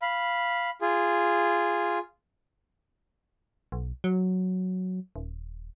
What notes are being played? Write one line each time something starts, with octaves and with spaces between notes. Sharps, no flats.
F5 B5
F4 G#4
B1
F#3
D#1